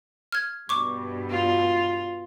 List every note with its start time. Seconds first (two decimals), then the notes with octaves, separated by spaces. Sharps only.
0.32 F6 G#6
0.69 G2 B2 C#6 D6
1.30 F4